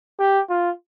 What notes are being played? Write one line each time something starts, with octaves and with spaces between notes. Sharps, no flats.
G4
F4